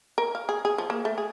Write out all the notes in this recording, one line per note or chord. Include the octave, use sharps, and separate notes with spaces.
A#4
F5
G#4
G#4
F3
A#3
A3
G#4